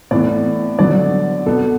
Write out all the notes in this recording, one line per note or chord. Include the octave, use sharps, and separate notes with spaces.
A2 E3 B3 D5
D3 F#3 B3 D5
B2 B3 A4